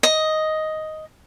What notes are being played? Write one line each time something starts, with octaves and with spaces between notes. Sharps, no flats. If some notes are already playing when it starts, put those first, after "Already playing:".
D#5